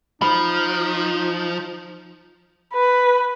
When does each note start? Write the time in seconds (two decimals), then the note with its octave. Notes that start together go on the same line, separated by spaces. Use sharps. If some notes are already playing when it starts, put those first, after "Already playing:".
0.22 F3 D#4 B5
2.73 B4